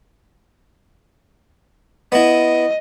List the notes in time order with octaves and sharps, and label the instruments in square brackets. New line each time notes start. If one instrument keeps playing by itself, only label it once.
[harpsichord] B3 E4 [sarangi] D#5